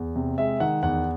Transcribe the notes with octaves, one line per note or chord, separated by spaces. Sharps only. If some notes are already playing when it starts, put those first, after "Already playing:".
Already playing: E2
C3
G#3 E5
D#3 F#5
E2 F#5